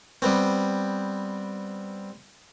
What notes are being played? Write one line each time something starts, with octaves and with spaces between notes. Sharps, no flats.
G3 B3 C4